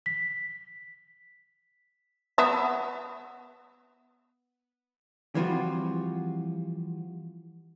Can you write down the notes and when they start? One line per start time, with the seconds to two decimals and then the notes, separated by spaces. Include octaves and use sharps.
0.06 B6
2.38 B3 E5
5.35 E3 F3 G3 C4 F4 F#4